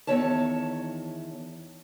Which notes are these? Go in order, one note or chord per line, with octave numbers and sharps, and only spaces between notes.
E2 G2 D#3 C#5 E5 A5